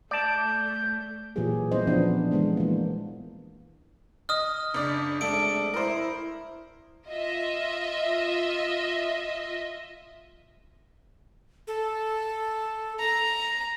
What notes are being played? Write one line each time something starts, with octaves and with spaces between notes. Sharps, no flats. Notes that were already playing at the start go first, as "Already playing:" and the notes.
A3 D5 A5 G6
A#2 E3 F#3 A#3 G4 G#4
G3 B3 C#4 E4 C5 D#5
E3 F3 B3 D4
E3 F3 G#3 B3 D4
E3 A#3
D#5 D#6 F6
F#1 D4 D5
C3 F#3 G#3 A3 D4 A4 D7
E4 A#4 C5
F4 D#5 E5
A4
A#5